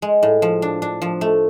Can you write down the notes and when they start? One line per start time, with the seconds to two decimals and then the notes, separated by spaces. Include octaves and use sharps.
0.02 G#3
0.23 A2
0.42 F3
0.62 D4
0.82 D4
1.02 F3
1.21 A3